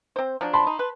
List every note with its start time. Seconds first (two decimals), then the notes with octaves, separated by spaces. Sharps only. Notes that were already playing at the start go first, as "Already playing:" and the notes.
0.16 C4 C5
0.41 F3 F#3 D4
0.53 A5 B5 C6
0.67 D#4
0.79 B4